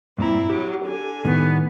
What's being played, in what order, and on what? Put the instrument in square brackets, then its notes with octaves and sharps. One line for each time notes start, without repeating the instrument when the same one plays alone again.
[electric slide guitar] G2 A#2 A#5 [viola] C4 E4
[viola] F#3 [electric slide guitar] G4
[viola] D3 G#5
[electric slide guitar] A2 D#3 G3 [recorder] B3